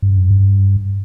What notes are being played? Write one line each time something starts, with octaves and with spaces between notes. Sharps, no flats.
G2
F#2
G2